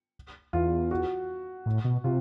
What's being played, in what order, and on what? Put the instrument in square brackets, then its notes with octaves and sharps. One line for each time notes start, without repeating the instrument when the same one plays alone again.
[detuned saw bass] E2 [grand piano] F4
[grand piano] F#4
[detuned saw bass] A2
B2
[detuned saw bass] C3 [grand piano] F4